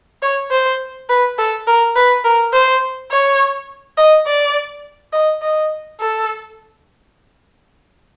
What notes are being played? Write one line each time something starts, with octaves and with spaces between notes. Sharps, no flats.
C#5
C5
B4
A4
A#4
B4
A#4
C5
C#5
D#5
D5
D#5
D#5
A4